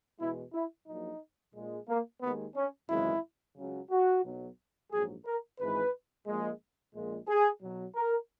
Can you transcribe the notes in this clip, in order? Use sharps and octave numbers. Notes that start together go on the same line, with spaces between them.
E2 B2 G#3 E4
E4
A#1 A#2 F#3 D#4
A#1 A#2 G#3
A#3
D#2 D#3 G#3 B3
C#4
G#1 F#2 C#3 E3 G#3 E4
C#2 C#3 F#3
F#4
B1 B2 F#3
A#1 G#2 F#3 G#4
A#4
G#1 G#2 E3 G#3 B4
A#1 A#2 G#3
A#1 A#2 G#3
G#4
B1 B2 F#3
A#4